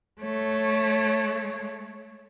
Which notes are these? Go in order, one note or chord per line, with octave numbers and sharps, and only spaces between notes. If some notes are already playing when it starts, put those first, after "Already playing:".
A3 C#5